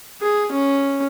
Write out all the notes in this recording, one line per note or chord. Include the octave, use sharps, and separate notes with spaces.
G#4
C#4